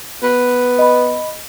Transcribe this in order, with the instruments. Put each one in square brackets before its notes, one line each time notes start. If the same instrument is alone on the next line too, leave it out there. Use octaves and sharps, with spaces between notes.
[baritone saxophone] B3
[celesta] D#5 B5